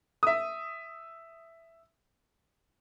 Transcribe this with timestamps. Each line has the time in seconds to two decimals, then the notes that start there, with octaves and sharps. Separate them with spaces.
0.23 E5 D#6